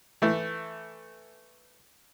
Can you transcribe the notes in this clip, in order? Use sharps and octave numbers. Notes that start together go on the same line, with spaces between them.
E3 A3